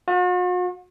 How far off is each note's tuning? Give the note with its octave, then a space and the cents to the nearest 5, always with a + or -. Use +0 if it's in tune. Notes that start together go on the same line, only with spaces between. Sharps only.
F#4 -45